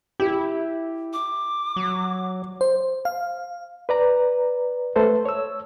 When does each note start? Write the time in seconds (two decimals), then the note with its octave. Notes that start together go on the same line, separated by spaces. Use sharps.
0.20 E4 G4
1.13 D6
1.76 F#3
2.61 C5
3.05 F5
3.89 B4 D5 A#5
4.96 A3 A4 B4 C5
5.25 C#5 E6